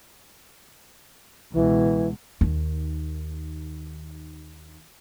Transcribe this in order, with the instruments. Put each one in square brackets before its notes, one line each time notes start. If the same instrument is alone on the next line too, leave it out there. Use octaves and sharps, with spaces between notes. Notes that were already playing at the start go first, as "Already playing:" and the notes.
[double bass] C#2 B2 [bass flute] E3
[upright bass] D#2 D#3